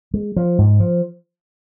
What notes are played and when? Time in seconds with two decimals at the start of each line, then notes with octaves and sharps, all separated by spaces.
0.14 G#3
0.36 F3
0.58 G#2
0.80 F3